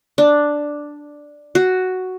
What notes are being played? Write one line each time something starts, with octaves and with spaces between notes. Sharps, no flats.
D4
F#4